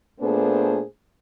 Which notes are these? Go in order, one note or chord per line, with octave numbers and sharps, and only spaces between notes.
A#2 A3 B3 D4 G#4 C5